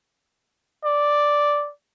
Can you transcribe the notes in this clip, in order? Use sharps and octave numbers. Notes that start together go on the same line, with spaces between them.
D5